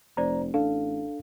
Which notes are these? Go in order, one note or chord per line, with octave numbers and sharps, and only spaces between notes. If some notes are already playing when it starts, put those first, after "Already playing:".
F1 C5 D5 A#5
A1 D4 A4 F5